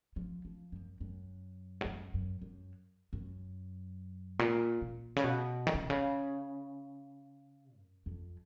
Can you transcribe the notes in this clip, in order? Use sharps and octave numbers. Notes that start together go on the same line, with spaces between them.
F3
F3
F#2
F#2
G#2
F#2
F#2
F#2
F#2
A#2
A#2
C#3
B2
D#3
C#3
B2
C#3
F#2
F2